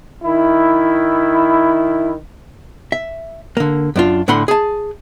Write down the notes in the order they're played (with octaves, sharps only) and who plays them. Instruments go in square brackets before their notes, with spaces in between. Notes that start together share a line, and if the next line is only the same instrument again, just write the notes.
[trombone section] D#3 E4
[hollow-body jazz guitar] E5
D3 A#3
F#2 D4 F4
A2 D3 F#5 B5 C6
G#4 A5